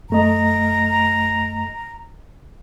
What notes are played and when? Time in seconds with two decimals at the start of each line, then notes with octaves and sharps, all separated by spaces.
0.10 F#2 A3 D#5 A#5